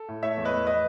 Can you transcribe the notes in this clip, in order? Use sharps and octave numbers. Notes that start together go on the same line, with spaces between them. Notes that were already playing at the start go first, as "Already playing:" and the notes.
Already playing: A4
A2
A3 C#5 E5
E2
B4 D#5
E2
B4 D#5